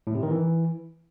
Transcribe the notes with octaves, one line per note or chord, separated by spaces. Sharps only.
A2
C3
D#3
E3